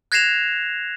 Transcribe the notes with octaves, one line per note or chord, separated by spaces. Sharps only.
F#6 G#6 A#6 C7 E7 F7